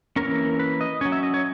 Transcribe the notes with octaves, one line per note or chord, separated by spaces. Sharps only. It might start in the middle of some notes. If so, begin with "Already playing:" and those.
E3 A#3 C#4 A#4
B4
D#5
F#3 C#4 C#5
E5
D#5
C#5